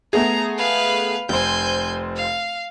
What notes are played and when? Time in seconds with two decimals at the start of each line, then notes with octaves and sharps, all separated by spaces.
0.13 A3 B3 G#4 A#5
0.58 B4 F5
1.29 F1 C5 G#5 G6
2.16 F5